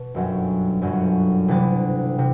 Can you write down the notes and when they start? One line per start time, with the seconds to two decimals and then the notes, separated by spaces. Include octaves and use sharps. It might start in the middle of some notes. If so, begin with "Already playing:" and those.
Already playing: B2
0.14 G1 F#2 F#3
0.81 G1 F#2 F#3
1.48 D2 C3 E3 A6
2.18 C3